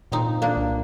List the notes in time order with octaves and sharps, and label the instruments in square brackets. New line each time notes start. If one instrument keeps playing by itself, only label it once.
[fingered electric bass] A#2 [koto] C4 D#4
[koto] A#3 D4
[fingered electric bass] C2